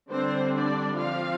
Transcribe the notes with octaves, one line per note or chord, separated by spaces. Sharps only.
D3 G3 C4 D4 C5
D4 D5
F3 C4 F4 F5